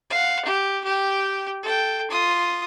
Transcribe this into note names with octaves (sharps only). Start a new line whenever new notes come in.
F5 F#5
G4
G4 G5
A4 G5
F4 D#6